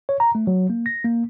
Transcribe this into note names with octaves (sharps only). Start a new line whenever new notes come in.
C#5
A#5
A3
F#3
A#3
A#6
A#3